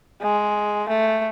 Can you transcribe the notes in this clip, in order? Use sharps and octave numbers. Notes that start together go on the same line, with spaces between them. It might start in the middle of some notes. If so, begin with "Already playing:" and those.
G#3
A3